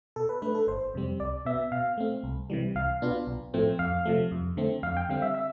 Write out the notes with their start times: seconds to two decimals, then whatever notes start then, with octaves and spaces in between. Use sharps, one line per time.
0.16 B2 A4
0.29 B4
0.42 A3 D4 B4
0.55 A4
0.67 G1 C5
0.94 F2 C3 G3 C4
1.20 C2 D5
1.45 B2 B3 E5
1.72 B2 F5
1.98 A3 C4
2.23 C2
2.50 C3 E3 G3
2.75 C2 F5
3.02 B2 B3 D4 F4
3.27 B1
3.54 A2 F3 A3 C4
3.79 F2 F5
4.05 C3 F3 A3
4.31 F2
4.57 D3 A3 C4
4.83 F2 F5
4.97 G5
5.09 D3 G3 C4 F5
5.22 E5
5.34 E5